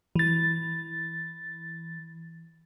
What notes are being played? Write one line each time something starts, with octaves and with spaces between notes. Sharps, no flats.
E3 A6